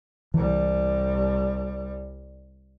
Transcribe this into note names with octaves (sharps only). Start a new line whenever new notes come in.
C2 E3 G3